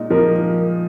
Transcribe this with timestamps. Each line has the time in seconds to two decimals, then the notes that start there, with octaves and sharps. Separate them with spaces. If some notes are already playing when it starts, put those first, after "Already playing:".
Already playing: A#2 G#3 D#4
0.10 F3 A#4